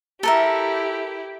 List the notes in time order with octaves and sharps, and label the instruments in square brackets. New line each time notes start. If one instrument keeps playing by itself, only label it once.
[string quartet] E4 G4 [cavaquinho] A4 A#4 E5